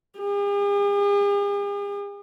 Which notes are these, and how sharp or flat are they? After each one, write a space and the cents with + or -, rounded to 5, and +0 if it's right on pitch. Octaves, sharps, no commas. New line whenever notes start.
G#4 -45